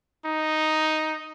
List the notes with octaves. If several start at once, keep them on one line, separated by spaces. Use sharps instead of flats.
D#4